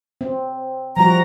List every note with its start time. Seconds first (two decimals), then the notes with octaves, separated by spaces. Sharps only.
0.21 C4
0.97 F3 G3 F#4 A#5